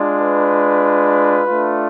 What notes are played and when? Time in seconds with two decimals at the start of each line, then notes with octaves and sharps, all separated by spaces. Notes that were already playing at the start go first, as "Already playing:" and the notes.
Already playing: G#3 D4 F4
0.20 B4
1.46 A3 D4 F4